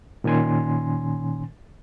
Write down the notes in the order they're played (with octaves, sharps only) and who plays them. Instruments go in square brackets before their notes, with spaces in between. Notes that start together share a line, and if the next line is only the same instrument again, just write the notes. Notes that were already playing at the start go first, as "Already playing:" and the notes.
[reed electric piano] A#2 D#3 C#4 G#5 C6